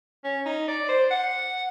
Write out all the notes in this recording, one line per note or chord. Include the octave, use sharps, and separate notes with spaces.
C#4
D#4
D5
C5
F#5